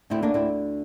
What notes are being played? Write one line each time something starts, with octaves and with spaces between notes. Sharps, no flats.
D2 D3 C4 E4
A#3 D4
C4 E4